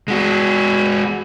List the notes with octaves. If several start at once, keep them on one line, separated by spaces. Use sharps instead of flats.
G#3 F#4